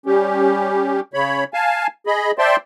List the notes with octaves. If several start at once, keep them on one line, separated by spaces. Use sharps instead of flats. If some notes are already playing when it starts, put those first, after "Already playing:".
G3 C#4 G4
C#3 C#5 B5
F5 G#5 A5
G#4 D#5 B5
C5 D5 E5 G5 A5 C6